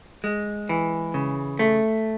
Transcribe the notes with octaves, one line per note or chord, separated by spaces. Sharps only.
G#3
E3
C#3
A3